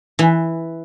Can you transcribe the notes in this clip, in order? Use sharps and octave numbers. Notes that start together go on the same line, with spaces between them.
E3